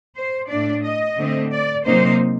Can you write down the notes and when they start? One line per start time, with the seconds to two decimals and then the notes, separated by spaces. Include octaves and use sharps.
0.16 C5
0.49 A2 A3 D4 D5
0.83 D#5
1.17 D3 A3 C4
1.51 D5
1.85 C3 F#3 A#3 D#4 C5